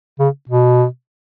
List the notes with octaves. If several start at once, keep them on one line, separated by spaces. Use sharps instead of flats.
C#3
B2